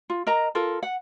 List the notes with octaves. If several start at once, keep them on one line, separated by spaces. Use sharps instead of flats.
F4
A#4 D#5 A#5
F4 A4 A#4
F#5